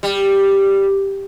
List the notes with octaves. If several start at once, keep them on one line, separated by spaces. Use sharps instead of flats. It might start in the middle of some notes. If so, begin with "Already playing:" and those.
G3